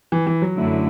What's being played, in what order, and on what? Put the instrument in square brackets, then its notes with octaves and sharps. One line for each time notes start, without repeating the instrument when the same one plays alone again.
[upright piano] E3
E3
F#3
[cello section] F#2 D3 A3 E4